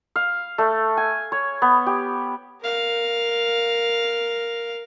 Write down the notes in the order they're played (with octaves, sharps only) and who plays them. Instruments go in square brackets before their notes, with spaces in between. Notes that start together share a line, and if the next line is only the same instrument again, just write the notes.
[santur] F5
A3
G#5
C#5
B3
G4
[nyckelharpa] A#4 F5